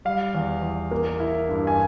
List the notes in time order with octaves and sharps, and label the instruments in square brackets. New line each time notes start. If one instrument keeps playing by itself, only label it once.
[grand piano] G3 F5
E2
E2
A#3
E4
G2
G#5